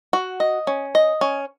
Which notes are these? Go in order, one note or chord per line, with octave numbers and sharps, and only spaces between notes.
F#4
D#5
C#4
D#5
C#4